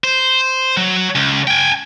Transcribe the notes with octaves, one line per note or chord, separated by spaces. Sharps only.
C5
F#3
C#2
G5 G#5